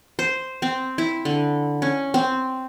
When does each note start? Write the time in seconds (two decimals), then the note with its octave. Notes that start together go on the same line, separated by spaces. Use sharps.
0.19 C5
0.62 C4
0.98 E4
1.25 D3
1.82 C#4
2.14 C4